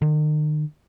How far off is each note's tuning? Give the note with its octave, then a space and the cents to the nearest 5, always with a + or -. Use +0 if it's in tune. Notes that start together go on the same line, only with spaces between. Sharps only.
D#3 -40